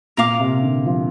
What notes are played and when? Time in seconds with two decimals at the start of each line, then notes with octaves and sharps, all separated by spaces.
0.17 A#2 A#4 F5 D6
0.40 C3
0.62 D3
0.86 F3